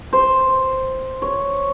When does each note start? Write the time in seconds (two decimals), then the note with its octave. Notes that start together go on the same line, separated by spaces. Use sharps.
0.13 C5
1.22 C#5